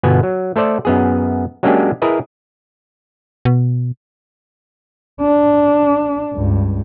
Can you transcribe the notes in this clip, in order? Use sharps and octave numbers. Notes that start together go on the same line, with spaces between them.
G1 B2 B3 G#5
F#3
A3 A4 C5 D5
F#2 B3 G#4
F#3 G#3 A#3 C#4 D4 G4
E4 G#4 A#4 B4 D#5
B2
D4
C#2 G2